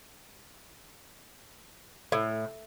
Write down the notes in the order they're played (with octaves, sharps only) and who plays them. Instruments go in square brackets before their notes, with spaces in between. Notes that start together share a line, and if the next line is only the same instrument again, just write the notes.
[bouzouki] A2